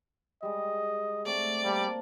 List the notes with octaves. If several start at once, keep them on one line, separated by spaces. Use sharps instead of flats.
G3 G#3 D#5
A3 C4 D5
G3 A#3 C5 A5